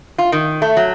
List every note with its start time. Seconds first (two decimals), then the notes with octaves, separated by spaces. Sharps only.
0.18 F4
0.32 D#3
0.62 A3
0.77 F#3